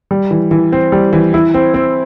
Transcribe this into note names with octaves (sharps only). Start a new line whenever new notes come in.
G3
E3
E3
C4
G3
E3
E4
C4
C4